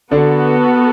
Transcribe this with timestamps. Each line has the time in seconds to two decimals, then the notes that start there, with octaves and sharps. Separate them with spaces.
0.11 D3 B3 D4 F#4 A4